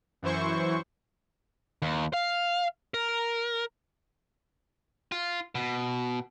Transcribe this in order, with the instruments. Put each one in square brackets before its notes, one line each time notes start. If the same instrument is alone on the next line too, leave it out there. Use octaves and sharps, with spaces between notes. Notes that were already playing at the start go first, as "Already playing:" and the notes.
[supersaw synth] F#2 E3 E4 C5 C#6
[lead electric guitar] D#2
F5
A#4
[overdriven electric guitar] F4
B2